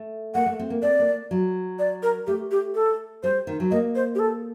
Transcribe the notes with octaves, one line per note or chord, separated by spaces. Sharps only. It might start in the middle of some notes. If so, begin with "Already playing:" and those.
Already playing: A3
A#3 F#5
A3
C4
A#3
C4 D5
A#3
F#3
D5
A#4
A3 G4
G4
A4
G3 C5
D#3
F#3
A#3 D#5
C5
G4
A4